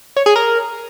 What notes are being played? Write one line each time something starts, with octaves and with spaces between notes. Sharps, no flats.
C#5
G#4
A#4